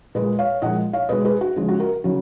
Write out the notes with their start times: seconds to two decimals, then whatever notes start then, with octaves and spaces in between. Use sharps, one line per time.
0.15 A#2 G#3 B4 D#5
0.39 C#5 F5
0.62 A#2 F3 G#3 D#5 F#5
0.93 C#5 F5
1.09 B2 G#3 B4 D#5
1.25 G#4 B4
1.41 F#4
1.56 C#3 F3 G#3
1.68 F#4
1.80 F#4 A#4
2.04 C#3 F#3